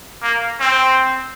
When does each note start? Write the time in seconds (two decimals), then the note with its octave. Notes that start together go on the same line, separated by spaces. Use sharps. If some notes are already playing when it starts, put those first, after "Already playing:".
0.22 A#3
0.60 C4